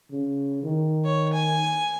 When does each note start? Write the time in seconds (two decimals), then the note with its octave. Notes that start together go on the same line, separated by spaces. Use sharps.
0.11 C#3
0.63 D#3
1.04 C#5
1.33 G#5